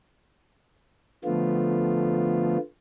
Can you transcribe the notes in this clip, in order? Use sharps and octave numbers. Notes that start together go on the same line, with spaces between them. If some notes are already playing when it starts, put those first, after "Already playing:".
D3 F3 A3 B3 F4